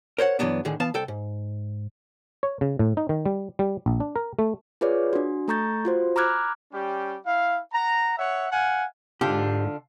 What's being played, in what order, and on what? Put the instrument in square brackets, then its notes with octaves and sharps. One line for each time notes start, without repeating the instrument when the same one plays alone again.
[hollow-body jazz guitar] A#4 C5 C#5 F#5
G2 E3 F#3 B3 D4
A2 D3 D#3 G#4
E3 B3 F5 A5
C2 A4 G5
G#2
[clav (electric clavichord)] C#5
C#3
A2
D#4
D#3
G3
G3
A#1
D4
A#4
A3
[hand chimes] F4 G#4 B4 C#5 D5
D4 F#4
A3 A4 A#5 C#6 G6 A6
F4 F#4 C5
A#5 B5 D6 F6 F#6 G#6
[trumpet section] G3 C#4 G4
E4 F5
F#5 A#5
C#5 E5 F#5
F5 F#5 G#5
[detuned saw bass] G#2 [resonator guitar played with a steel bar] D3 D4 F4 [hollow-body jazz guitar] G4